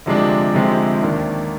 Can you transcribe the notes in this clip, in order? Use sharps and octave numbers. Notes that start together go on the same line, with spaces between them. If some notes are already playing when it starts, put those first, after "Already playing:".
D2 C3 F3 G#3 D4
D2 C3 F3 G#3 C4
D#2 D#3 A#3 D4